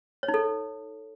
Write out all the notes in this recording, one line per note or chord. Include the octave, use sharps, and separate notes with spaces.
C#5
D#4
A4